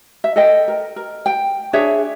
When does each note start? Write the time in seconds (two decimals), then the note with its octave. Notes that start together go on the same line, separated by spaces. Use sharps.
0.24 E5
0.36 A4 D#5 G5
0.68 A#4
0.96 A#4
1.26 G5
1.73 D4 G#4 C#5 E5